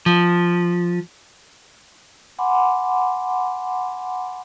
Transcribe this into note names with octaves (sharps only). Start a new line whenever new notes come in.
F3
F#5 G#5 B5 C6 D6